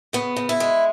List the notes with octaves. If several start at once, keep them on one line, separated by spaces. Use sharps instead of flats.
C#3 B3
C#3
E4
G#3